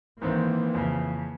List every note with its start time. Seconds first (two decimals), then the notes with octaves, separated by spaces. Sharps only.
0.22 G#2 D#3 E3 A#3 C4
0.75 F2 C#3